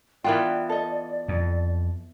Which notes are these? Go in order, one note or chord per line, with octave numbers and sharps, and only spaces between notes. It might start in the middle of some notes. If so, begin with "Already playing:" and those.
E3 B3 F4 A#4 D5 G5
A4 D#5
F2